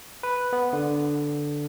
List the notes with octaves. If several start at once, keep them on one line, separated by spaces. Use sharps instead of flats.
B4
B3
D3